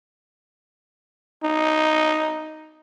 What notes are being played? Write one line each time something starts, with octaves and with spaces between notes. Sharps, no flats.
D#4